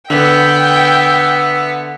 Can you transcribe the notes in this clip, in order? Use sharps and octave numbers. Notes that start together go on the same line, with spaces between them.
D3 B3 E5 G5